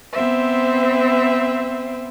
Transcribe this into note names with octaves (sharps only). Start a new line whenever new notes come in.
B3 C4 C5 E5